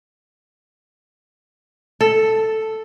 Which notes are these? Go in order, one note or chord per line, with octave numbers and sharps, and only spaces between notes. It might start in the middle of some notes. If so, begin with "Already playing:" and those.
A4